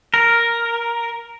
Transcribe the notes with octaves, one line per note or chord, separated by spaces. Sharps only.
A#4